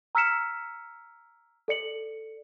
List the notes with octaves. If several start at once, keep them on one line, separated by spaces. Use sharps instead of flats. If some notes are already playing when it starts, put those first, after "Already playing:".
A#5 E6 F6 B6 C#7 E7
A4 D5 C#7 F#7